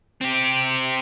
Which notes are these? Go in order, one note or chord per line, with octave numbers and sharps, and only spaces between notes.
C4 G4